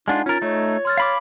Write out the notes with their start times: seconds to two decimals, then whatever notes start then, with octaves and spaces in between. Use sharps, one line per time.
0.08 G#3 D4 D#4 F4 F#5 G#5
0.26 C#4 F4 A#4 A6
0.42 A3 D#4 C#5
0.85 C6 F6 A6
0.97 F5 B5 D6